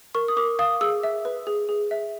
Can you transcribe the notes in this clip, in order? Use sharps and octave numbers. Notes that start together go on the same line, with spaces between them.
A#4 C#6
D#6
A#4 D6
F5 D#6
G#4 E6
E5
B4
G#4
G#4
E5